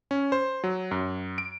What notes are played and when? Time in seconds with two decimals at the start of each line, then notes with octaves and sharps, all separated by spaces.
0.11 C#4
0.32 C5
0.64 F#3
0.91 F#2
1.38 D7